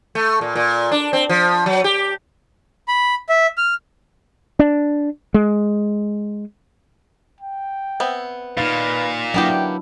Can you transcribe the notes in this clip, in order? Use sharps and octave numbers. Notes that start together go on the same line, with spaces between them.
A3
A#2
A#2
D4
C4
F3
F#3
G4
B5
E5
F6
D4
G#3
G5
B3 C4 E5
A#2 D#4 B4 F5
F#3 A#3 B3 D4 E4 G4 G5